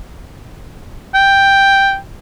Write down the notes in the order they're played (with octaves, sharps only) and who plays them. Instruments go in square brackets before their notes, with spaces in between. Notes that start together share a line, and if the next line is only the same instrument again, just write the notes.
[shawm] G5